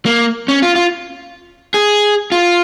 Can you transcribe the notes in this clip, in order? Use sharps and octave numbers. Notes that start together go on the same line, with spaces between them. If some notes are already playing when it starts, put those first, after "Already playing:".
A#3
C#4
F4
F4
G#4
F4